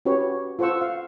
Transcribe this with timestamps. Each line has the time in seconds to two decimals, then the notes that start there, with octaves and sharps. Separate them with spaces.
0.05 C#4 F#4 G4 B4 C#5
0.59 F4 A4 C5 F#5 C#6 E6
0.81 F5